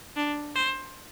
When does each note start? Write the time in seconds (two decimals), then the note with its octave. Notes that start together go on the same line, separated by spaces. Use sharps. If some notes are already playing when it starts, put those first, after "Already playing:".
0.17 D4
0.56 C5